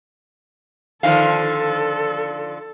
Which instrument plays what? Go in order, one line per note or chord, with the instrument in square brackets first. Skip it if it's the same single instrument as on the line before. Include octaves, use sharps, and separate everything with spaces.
[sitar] D3 D#3 F3 [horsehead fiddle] A4 [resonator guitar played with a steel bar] F5